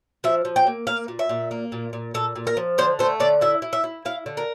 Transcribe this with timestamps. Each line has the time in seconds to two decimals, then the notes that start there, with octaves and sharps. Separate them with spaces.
0.24 F3 E5
0.45 F3
0.56 G5
0.67 A#3
0.87 A#3 F5
1.08 A#2
1.19 E5
1.29 A#2
1.51 A#3
1.72 A#2
1.93 A#2
2.14 A#2 A4
2.36 A#2
2.47 A#4
2.57 F3
2.78 D3 C5
2.99 A3 C5
3.20 D3 D5
3.41 E4 E5
3.62 E4
3.73 E5
3.84 E4
4.05 E4 F5
4.26 D3
4.37 A#4